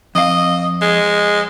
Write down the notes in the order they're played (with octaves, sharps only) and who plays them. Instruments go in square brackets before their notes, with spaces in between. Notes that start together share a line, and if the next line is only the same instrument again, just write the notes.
[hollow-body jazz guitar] F2 F5 [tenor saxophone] D#5
[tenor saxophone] G#3